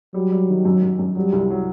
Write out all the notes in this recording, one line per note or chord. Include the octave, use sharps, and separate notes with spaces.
F#3 G3
G3
D#3
F#2
F#2
F#2
F#3 G3
C2
F#3